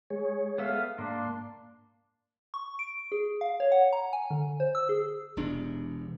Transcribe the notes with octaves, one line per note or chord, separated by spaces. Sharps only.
G#3 G#4 C#5
B3 A4 E5 F5
G#2 A#3 D4 C6
C#6
D7
G#4
F5
C#5
F#5
A#5
G#5
D3
C5
E6
G#4
E1 E2 C3 D4